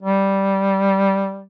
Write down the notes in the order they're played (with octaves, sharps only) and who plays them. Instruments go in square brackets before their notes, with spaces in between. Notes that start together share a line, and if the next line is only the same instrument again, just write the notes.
[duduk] G3